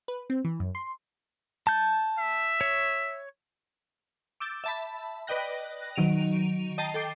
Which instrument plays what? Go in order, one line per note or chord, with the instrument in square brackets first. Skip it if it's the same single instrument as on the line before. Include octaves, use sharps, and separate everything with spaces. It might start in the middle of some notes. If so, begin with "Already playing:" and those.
[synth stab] B4
C4
E3
F#2
C6
[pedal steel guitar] A5 G6
[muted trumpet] E5
[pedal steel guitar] C#5
[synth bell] D6 E6 G6 A6
E5 A5 B5
B4 D5 D#5 G5 F#6 A#6
D#3 F#3 D7 D#7 F7
D#5 G5 A5 A#5 C7
A4 G5 D6 C7